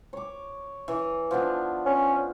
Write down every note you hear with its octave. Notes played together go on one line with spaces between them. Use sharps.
C#5 D6
E3
F3 B3 D4
C#4